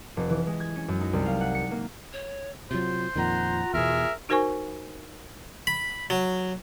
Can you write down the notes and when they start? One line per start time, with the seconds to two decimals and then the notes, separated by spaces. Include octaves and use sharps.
0.17 F1
0.30 E3
0.47 G#3
0.60 G#6
0.76 C#4
0.88 F#2
1.00 D#4
1.13 C2
1.26 F5
1.41 F#5
1.55 C#7
1.71 A#3
2.13 C#5
2.71 C3 F#3 F4 C5
3.16 F2 A#2 D#3 F4 F#5 A#5
3.74 E2 B2 G#4 A#4 E5
4.29 D#4 F#4 A#4 C5 G#5 C#6
5.67 B5
6.10 F#3